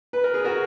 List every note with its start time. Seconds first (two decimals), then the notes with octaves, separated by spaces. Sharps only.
0.13 B4
0.24 A#4
0.34 G#4
0.44 F#4 A#4